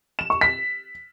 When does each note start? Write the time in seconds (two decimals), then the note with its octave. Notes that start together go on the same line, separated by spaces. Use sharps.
0.19 E7
0.30 C#6
0.41 B6